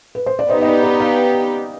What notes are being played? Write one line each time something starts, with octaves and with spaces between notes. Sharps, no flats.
B4
C5
D5
B3 D#4 G4 C5 D#5
D#5
B4 D5
B4 D5
D5 F5